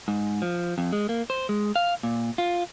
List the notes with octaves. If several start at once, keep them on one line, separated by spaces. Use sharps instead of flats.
G#2
F3
F2
G#3
A#3
C5
G#3
F5
A#2
F4